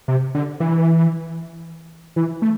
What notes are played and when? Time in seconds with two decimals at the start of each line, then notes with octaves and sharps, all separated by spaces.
0.08 C3
0.35 D3
0.60 E3
2.16 E3
2.42 A3